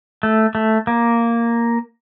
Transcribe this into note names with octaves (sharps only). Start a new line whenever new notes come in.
A3
A3
A#3